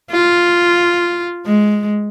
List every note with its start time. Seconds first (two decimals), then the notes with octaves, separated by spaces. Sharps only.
0.12 F4
1.46 G#3